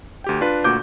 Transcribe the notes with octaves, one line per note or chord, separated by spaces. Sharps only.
D2 G4 G5
D4 F4 B4
D2 A#2 F#4 D6 G6